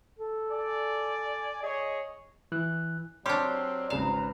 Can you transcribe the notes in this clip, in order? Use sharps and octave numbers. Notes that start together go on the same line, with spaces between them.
A4
D5 G#5
G#4 C#5 D#5
E3 F#6
F#3 C4 D4 G4 C#5 D5 C6 F6
G#1 C#3 B4 F5 A#5 E7